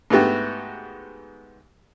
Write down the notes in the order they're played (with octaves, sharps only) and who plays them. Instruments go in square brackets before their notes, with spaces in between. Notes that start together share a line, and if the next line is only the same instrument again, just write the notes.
[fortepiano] G#2 A3 B3 F#4 G4